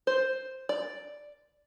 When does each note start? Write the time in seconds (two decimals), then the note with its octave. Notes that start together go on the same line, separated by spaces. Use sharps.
0.07 C5
0.69 D5